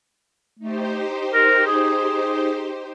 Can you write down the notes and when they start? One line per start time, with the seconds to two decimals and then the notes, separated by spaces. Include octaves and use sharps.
0.59 A3 D#4 G4 C5
1.32 A#4
1.66 G#4